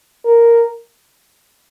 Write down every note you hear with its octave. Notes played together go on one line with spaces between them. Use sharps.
A#4